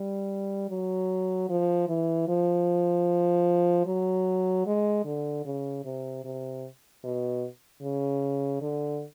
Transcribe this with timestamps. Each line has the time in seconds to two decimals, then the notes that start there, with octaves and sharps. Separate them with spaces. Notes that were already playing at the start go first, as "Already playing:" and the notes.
Already playing: G3
0.70 F#3
1.49 F3
1.88 E3
2.28 F3
3.86 F#3
4.67 G#3
5.05 D3
5.45 C#3
5.85 C3
6.25 C3
7.04 B2
7.82 C#3
8.62 D3